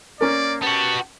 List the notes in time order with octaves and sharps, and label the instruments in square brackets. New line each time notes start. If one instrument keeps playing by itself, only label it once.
[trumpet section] A#3 D5 [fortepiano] C#4 A#4
[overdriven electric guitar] B3 F#4 [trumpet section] G4 A5